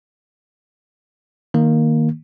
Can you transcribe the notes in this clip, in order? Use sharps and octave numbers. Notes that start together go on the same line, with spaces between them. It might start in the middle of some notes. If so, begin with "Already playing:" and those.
D#3 A#3